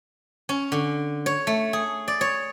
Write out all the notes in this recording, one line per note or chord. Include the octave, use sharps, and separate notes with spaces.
C#4
D3
C#5
A3
G#4
D5
C#5